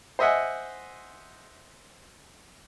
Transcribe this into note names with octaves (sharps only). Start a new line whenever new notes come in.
C5 D#5 E5 F#5 G#5